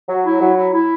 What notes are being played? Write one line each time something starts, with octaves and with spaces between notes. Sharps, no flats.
F#3
E4
F#3
E4
E4